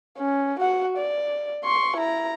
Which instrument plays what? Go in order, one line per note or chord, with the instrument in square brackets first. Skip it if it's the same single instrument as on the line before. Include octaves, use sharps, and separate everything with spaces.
[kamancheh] C#4
F#4 F#5
D5
C6 C#6
E4 A#5